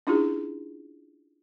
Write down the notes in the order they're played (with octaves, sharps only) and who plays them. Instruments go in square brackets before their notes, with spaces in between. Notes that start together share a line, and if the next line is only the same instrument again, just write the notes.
[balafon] C#4 D4 E4 F4 G4 G#4